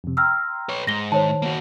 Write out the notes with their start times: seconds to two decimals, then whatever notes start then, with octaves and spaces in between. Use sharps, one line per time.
0.04 F2 C3
0.17 G5 A#5 C6 E6 F6
0.69 B4 C#5
0.87 G#2 A#6 G7
1.12 D#3 C5 C#5 A5
1.42 A#3 F#4